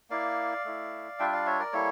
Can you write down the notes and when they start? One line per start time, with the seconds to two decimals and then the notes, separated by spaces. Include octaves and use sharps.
0.10 A#3 E4 D5 F5
0.65 A3 E4
1.19 G3 D4 F4 E5 G5
1.32 D5 F5
1.46 C#5 E5
1.60 A#4 D5
1.73 G3 A#3 E4 A4 C#5